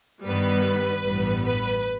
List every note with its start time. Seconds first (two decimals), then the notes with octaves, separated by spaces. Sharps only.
0.23 G2 D#3 G3 B3 B4
1.04 A1 G2 E3 G3 B3
1.43 B4